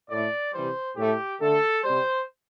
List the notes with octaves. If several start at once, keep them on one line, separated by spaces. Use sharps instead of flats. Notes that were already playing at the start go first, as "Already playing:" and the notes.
A2 A3 D5
C3 E3 G3 C5
A2 A3 G4
D3 A3 A4
C3 G3 C5